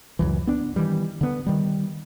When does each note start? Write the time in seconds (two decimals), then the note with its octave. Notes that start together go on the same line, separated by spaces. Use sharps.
0.19 C#2 F#2 E3
0.47 B3 D4
0.76 D#3 E3 G3
1.21 D3 B3
1.46 D#3 G3